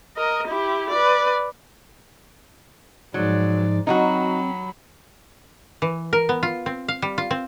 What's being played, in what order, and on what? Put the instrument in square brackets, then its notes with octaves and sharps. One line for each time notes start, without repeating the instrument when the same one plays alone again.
[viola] A#4 D#5
E4 G4
B4 D5
[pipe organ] G#2 F3 D#4 [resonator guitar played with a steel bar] F#3 [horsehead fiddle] G#3 D5
[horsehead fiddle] F#3 B5 [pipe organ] C4 [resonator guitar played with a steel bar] D#4 F4 F#4
[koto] E3
A#4
B3
F4
C4
F5
G3
F4
C4